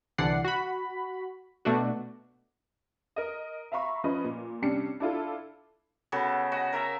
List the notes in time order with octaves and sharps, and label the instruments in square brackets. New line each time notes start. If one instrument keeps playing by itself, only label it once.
[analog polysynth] C2 D3 E3 D5 F#5 C7
F#4 B5
B2 A3 D4 F#4
[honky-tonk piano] A#4 D#5
E5 F5 A#5 B5 C#6
F3 C#4 B4 D#5
A#2
C3 G3 C#4 D4 C7 C#7
D4 E4 F4 A4
[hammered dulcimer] C#3 B3 F#4 A4
F#4 D#5
A#4 E5 F5 A#5